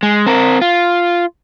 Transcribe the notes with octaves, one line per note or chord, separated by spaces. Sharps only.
G#3
C4 A#4
F4